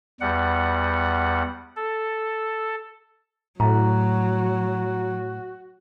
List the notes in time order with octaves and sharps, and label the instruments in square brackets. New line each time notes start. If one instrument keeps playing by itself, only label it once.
[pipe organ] E2 G3 F#5
A4
[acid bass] A2 [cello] F#3 [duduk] F#4 [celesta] A#5